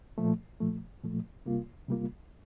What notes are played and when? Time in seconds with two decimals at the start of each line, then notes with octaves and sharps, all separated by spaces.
0.18 A#2 F3 A3
0.60 A#2 F3 A3
1.04 A#2 F3 A3
1.46 C3 G3 A#3 F4
1.88 C3 G3 A#3 F4